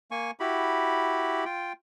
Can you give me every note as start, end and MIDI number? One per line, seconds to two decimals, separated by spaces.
0.11 0.31 58
0.11 0.31 80
0.11 0.31 85
0.40 1.44 64
0.40 1.44 66
0.40 1.44 67
0.40 1.44 83
1.45 1.73 65
1.45 1.73 79